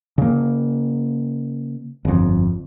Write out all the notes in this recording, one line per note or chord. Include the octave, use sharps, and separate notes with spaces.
C#3 A#3
G1 F2